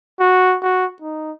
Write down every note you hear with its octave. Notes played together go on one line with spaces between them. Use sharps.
F#4
F#4
D#4